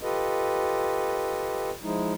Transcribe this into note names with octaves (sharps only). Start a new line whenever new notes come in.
F4 G4 A4 B4 D#5
F3 G#3 D#4 E4